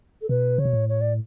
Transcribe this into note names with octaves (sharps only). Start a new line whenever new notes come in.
A4
B2 B4
C#3 C#5
B2
A2
C#5
D5